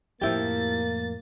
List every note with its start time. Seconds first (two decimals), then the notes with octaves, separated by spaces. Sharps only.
0.21 F2 A2 F3 A#3 E4 G4 A6